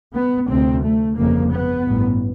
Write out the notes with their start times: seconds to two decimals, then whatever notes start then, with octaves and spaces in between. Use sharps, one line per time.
0.15 B3
0.50 D2 C3 C4
0.84 A3
1.18 G1 F2 C#3 A#3
1.52 B3
1.86 A1 G2